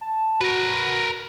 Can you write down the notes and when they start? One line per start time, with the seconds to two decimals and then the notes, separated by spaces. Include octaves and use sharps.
0.01 A5
0.41 F#4 A#4 B4